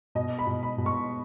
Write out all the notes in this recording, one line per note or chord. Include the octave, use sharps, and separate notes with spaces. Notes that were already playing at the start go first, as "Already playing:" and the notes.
B2 D#5
B5
B2
B5
B2
C#6